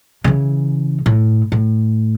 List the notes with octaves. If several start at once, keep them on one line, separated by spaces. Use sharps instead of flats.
C#3 E3
A2
A2